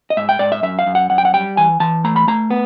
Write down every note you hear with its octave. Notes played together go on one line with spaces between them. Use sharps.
D#5
G#2 E5
G5
G#2 D5
E5
F#2 E5
F5
F#2
F#5
F#2 F#5
G5
F#5
G3 G5
E3 G#5
E3 A5
A3 A#5
B5
A3 A#5
B3